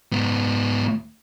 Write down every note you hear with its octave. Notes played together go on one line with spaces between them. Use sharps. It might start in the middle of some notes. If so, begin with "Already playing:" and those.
G#2 B3